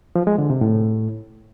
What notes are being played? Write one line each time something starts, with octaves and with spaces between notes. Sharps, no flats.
F3
G#3
D3
C3
A2